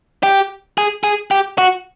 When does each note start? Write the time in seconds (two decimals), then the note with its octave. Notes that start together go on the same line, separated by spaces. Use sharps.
0.23 G4
0.78 G#4
1.04 G#4
1.31 G4
1.58 F#4